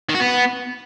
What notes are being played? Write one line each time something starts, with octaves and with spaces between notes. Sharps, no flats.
D#3
F#4
B3